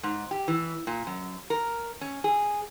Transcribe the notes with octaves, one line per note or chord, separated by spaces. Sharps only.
G#2
G4
E3
A#2
F#2
A#4
C#4
G#4